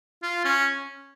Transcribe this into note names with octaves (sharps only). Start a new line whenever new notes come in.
F4
C#4